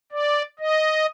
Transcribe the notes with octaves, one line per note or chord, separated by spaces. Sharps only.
D5
D#5